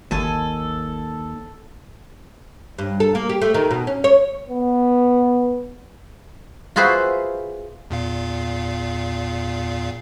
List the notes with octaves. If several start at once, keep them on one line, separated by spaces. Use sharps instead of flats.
G#1 D#2 A4 G#5
G2
A4
A#3
G4
A3
D#3
B2
C#4
C#5
B3
F4 F#4 G#4 B4 C5 E5
E2 A#2 F5